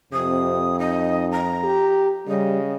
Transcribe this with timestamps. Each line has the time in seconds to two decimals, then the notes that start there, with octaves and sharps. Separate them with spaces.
0.13 F2 C3 D#6
0.79 D#4 D#5
1.32 A#5
1.64 G4
2.27 C#3 G3 D#5